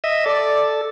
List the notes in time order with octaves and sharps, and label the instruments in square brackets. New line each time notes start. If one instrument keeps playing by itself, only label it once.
[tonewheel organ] D#5 E5
[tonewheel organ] A4 [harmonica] D5